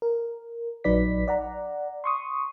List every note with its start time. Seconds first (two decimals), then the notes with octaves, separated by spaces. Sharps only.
0.02 A#4
0.84 A#1 F#3 D#4 B4 D5 B6
1.28 D5 F#5 A#5
2.04 C6 C#6 D#6